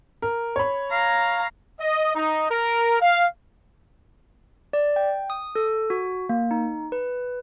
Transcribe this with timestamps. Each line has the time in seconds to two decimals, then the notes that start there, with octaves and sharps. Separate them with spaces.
0.22 A#4
0.56 C#5 B5
0.92 F5 A#5
1.80 D#5
2.15 D#4
2.50 A#4
3.00 F5
4.73 D5
4.96 G5
5.30 D#6
5.55 A4
5.90 F#4
6.29 A#3
6.51 D#4
6.92 B4